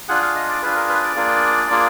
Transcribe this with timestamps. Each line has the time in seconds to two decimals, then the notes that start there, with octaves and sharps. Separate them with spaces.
0.09 D4 F4 G#4 F#5
0.22 F5
0.35 D#5
0.48 D5
0.62 D4 F4 G#4 B4
0.76 A#4
0.89 B4
1.03 D5
1.16 A#3 D4 F4 G#4
1.70 A#3 D4 F4 G#4